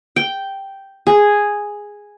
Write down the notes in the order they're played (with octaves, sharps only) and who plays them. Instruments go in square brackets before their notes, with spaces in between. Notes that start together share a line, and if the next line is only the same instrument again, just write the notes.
[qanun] G5
G#4